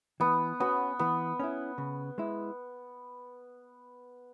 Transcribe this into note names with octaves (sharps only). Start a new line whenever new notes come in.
E3 B3
B3 C#4 F#4
E3 B3
C#4 E4
C#3
G#3 E4